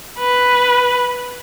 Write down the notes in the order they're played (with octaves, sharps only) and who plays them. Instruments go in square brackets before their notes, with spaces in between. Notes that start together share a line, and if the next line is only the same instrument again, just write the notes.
[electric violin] B4